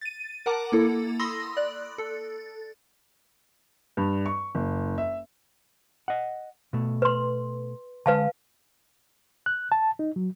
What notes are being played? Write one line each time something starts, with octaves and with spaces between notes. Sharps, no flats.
A6 D#7
A#4 F#5 A5 A#5 D6
A#3 E4 A4
B5 C6 D#6 E6 A#6
D5 F#6
A4
G2
C#6
F#1
E5
D#5 F#5
B2 A3
B4 C6
D3 G#3 B4 F5 A5
F#6
A5
D#4
F#3